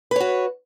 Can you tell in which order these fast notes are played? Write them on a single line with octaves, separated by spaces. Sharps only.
B4 C#5 F#4